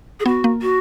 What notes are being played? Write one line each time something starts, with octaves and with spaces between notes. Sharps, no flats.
G#4
B3 F#4
A#3
F#4